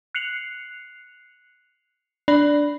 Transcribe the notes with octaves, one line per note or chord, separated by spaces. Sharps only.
F#6 C7 C#7 F7 F#7
D4 D5 B5